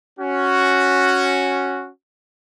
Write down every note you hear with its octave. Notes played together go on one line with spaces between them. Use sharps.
C#4 F#4